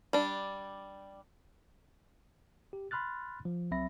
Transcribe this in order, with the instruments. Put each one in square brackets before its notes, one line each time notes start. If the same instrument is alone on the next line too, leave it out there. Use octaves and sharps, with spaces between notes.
[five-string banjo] G3 D4
[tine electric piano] G4
B5 C6 F6 F#6 A6
F3
C2 F#3 C4 E5 B5 A#6